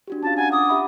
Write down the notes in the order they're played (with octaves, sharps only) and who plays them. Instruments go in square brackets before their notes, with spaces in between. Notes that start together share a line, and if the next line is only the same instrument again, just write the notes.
[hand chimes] D4 F#4 G4
[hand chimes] C#4 F4 F5 [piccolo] A5
[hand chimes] D4 F#5 A#5 [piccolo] G#5
[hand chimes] F#5 A#5 D6 [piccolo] D#6
[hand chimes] G4 E5 B5